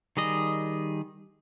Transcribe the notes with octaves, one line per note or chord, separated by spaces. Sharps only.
D#3 G3 G#4 D#5